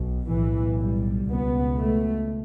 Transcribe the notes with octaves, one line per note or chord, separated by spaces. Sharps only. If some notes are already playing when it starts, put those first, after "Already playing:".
Already playing: B1 B2
B1 A2 E3
G3
C#2 B2 B3
A3